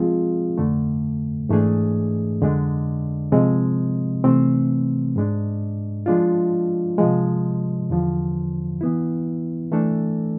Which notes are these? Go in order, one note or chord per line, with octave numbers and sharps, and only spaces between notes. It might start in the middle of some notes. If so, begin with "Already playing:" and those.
Already playing: F3 G#3 C4 F4 G#4
F2 D3 A3
G#2 E3 A3 D4 G#4
F2 D3 G#3 D4
C3 F3 G#3 C4
C3 E3 A3 C4
G#2 G#3 D4
F3 G#3 D4 F4
C3 F3 G#3
E2 D3 F3
E3 B3 E4
E3 A3 D4 A4